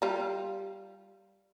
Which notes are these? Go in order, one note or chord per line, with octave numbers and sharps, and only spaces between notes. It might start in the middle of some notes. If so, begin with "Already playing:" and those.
G3 F4